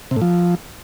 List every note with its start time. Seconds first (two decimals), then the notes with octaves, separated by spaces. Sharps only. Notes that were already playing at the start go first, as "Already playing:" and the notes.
0.11 C3
0.16 A2
0.21 F3